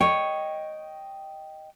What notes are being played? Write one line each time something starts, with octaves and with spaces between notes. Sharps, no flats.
C#5 D#5 G5